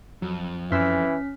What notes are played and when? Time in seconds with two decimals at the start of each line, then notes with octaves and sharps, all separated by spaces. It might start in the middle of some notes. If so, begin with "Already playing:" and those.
0.22 F2 F#3
0.72 F#2 E3 C#4 C6 E6 F6 B6